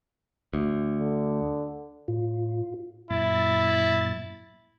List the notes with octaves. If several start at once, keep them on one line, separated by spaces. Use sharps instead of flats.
D2
D3
A2 F4
F#2 A#2 E4 A6